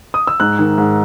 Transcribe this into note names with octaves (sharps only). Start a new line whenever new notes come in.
D#6
E6
G#2 F#6
D#3
G#2